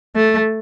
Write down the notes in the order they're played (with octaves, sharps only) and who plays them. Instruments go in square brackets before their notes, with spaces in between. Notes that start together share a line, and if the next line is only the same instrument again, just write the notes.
[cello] A3